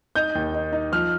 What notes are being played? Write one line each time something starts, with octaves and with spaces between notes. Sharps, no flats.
D#4 G6
D#2
D#4
D#4
F3 F6